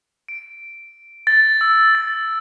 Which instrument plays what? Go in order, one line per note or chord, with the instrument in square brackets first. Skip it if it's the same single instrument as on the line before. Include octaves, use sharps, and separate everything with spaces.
[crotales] D7
A6
E6
A6